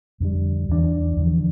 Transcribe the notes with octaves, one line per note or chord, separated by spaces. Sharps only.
F2 D3 G3
E2 E3 G3 D4
E2 D3 F3